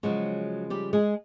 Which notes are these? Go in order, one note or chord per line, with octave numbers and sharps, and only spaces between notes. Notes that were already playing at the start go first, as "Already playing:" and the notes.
C#3 F3 F#3 G#3 F#4
G3 G4
G#3 G#4